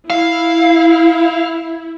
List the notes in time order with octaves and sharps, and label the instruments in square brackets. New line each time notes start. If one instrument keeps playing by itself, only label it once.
[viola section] E4 [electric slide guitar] F5